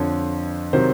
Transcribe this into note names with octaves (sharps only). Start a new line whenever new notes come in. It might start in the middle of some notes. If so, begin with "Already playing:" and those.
Already playing: F2 D3 F3 C#5
C3 D#3 F#3 C5